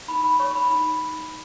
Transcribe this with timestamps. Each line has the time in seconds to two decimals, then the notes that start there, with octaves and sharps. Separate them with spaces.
0.08 D#4 B5
0.24 B5
0.40 C#5 C#6
0.55 B5
0.70 D#4 B5